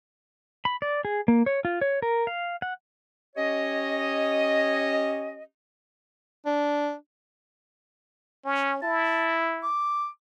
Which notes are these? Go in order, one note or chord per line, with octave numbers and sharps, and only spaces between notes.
B5
D5
G#4
A#3
C#5
F4
C#5
A#4
F5
F#5
C#4 G4 C#5 D#5
D4
C#4
E4 A5
D6